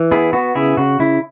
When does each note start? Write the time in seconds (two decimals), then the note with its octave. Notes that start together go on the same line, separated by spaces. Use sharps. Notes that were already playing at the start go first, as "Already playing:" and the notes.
Already playing: E3
0.11 B3 E4 G#4
0.33 B3 F#4
0.55 C#3 E4 G#4
0.77 C#3 F#4
0.99 C#3 E4